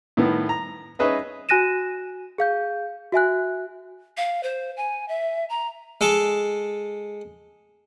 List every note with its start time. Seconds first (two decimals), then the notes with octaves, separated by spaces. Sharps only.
0.17 A2 D#3 B3
0.49 A#5
0.99 C#4 D#4 G#4 B4 D#5 E5
1.49 F#4 G#5 F#6 A#6 D#7 E7
2.38 G#4 F5 G6
3.12 F#4 E5 G#5 F#6
4.17 F5
4.43 C5
4.77 G#5
5.08 E5
5.49 A#5
6.01 G#3 A4